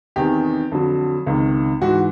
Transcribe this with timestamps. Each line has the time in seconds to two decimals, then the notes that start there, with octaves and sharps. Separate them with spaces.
0.16 E2 C3 D#3 G4
0.72 F2 D3 F#3
1.26 C#2 C3 D#3
1.82 G#2 E3 F#4